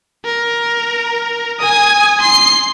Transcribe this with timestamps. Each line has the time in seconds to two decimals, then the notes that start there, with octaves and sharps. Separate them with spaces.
0.25 A#4
1.59 G#5 D#6
2.20 C6 C7